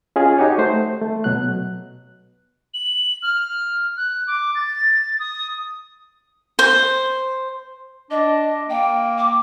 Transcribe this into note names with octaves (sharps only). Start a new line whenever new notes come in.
C#4 F4 G#4 D#5
D#4 F#4 G4 C#5
A3 C5
A3
B2 F#3 F#6
F#7
F6
F#6
D6
A6
D#6
C5
D4 D#5
A#3 G5
D6